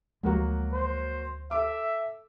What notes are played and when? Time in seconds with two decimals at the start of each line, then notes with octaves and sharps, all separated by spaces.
0.23 D2 F3 F#3 G#3 A#3 F#4
0.73 C5
1.51 A4 E5 D6